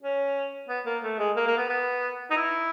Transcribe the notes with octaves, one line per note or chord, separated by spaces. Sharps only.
C#4
B3
A#3
A3
G#3
A#3
A#3
B3
B3
D#4
E4